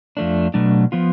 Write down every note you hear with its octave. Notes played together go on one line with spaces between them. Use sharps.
F2 F3 A3 D4
B2 F#3 A3 D4
F3 B3 F4